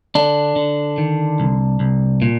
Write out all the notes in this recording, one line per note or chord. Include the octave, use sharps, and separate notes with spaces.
D3 D4
D3
D#3
C2
C2
A#2